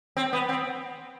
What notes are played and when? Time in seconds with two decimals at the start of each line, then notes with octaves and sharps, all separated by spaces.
0.17 C4
0.33 B3
0.49 C4